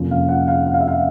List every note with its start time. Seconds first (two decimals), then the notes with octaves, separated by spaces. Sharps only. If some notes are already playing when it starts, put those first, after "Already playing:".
Already playing: F2 C3 F3 A#3 C#4
0.11 F5
0.29 F#5
0.48 F5
0.66 F#5
0.74 F5
0.80 E5
0.88 F5